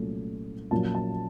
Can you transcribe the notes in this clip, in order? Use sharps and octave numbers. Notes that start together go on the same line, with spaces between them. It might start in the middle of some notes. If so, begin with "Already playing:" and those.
Already playing: C2 A#2 F#3 A3 C#4
A#1 A#2 F#3 A#3 C#4 A5
A5